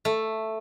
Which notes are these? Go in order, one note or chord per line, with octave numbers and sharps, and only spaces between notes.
A3